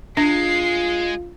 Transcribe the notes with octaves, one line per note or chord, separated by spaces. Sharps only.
G#3 D4 F4 C7